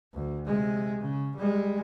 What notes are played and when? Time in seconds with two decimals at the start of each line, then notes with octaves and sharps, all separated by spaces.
0.14 D2
0.45 C3 G#3
1.01 C#3
1.37 G3 G#3